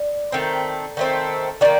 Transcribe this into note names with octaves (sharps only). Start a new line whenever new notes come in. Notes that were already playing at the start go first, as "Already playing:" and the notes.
Already playing: D5
D#3 A3 C4
D#3 A3 C4
D#3 A#3 D4 D5